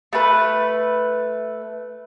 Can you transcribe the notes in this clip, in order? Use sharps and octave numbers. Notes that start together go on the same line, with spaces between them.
A3 B4